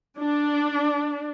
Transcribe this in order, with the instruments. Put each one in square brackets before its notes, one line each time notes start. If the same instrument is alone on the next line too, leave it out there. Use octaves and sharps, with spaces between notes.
[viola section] D4